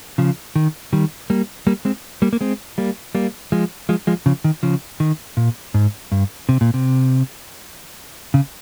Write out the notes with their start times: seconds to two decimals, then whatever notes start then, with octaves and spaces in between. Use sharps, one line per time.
0.18 C#3 F3
0.56 D#3
0.93 D#3 G3
1.30 G3 A#3
1.67 G3 A#3
1.85 G#3 C4
2.22 G3 A#3
2.33 A#3
2.41 G#3 C4
2.78 G3 A#3
3.15 G3 A#3
3.52 F3 G#3
3.89 F3 G#3
4.07 F3 G#3
4.26 C#3 F3
4.44 D#3
4.63 C#3 F3
5.00 D#3
5.37 A#2
5.74 G#2
6.12 G2
6.49 C3
6.61 A#2
6.74 C3
8.34 C#3